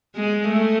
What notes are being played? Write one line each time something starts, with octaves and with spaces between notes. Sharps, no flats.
G#3
A3